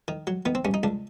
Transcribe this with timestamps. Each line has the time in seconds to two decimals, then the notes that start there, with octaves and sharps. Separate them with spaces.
0.08 D#3
0.27 F#3
0.46 D#3 B3
0.55 C4
0.65 G2 C#4
0.74 D#4
0.83 C#2 D4